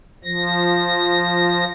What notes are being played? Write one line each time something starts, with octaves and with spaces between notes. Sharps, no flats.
F3 A#6